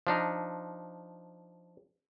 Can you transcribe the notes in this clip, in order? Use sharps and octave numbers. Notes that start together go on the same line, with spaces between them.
F3 D4 D#4